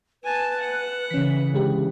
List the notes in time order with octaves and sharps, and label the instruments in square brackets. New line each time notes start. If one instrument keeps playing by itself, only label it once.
[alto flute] B4 [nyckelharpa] G#5 A5
[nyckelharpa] F#5
[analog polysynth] C#3 E3 [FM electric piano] C#4 B6
[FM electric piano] D3 G#3 G4